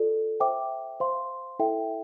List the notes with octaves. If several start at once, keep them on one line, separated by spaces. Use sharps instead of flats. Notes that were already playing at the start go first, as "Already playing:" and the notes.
Already playing: F4 A4 D5
C5 E5 G5 D6
C5 F5 C6
E4 A4 E5 G5